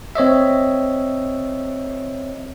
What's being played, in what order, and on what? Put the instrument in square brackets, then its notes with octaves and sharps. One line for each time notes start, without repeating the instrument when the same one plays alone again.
[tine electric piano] C4 C#5 D#5 E5